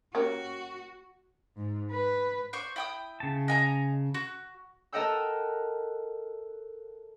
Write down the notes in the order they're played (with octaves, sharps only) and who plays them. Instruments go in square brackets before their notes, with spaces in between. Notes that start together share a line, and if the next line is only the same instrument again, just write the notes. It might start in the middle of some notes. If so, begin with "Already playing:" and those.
[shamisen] A#3 C#4 G4 [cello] F#4
[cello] G#2
B4
[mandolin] C5 D5 C#6
E4 G5 D#6
[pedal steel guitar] C#3 A5
[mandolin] D#5 G#5 A#5
F#4
[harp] A4 A#4 D#5 F#5 G5 E6